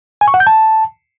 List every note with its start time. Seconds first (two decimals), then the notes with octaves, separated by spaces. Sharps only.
0.21 G#5
0.28 C#6
0.34 F#5
0.40 G6
0.47 A5